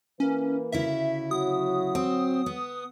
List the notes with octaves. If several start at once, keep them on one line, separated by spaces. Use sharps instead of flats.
E3 A#3 C#4 B4
D2 C#3 E4 E5
F#3 F#4 D#6
C4
B3